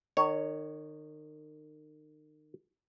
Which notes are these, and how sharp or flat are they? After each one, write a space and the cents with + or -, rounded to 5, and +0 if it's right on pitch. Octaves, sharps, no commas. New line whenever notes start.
D#3 -35 C#5 +0